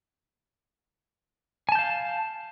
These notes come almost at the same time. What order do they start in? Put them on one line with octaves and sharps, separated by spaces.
G#5 A5 G6 F5